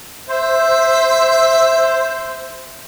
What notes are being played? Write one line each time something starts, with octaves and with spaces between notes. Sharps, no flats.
C5 E5